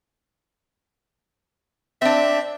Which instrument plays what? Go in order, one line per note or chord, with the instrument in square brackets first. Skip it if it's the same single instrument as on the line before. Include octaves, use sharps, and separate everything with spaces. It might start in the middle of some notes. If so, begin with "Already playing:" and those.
[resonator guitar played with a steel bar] C4 D4 [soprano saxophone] E5